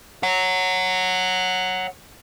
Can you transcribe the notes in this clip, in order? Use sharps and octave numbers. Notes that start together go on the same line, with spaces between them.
C#5 F#5